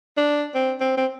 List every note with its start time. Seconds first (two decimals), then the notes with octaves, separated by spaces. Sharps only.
0.17 D4
0.55 C4
0.81 C4
0.97 C4